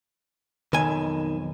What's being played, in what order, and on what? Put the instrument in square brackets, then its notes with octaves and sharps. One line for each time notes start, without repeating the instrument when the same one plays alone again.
[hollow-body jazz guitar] B1 F2 G#5 [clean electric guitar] D#3